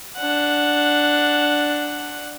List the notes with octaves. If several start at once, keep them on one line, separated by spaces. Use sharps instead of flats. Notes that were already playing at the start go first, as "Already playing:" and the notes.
D4 F#5